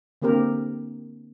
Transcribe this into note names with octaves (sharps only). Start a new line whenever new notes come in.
D3 A#3 C4 G4 A#4